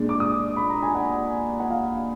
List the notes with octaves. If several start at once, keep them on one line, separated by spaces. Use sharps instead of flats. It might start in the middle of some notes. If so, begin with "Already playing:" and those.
Already playing: A#2 G#3 D4
D6
D#6
B5
A#5
G#5
F#5
F#5
F5